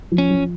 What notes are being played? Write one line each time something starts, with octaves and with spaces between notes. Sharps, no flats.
F3
C#4
F3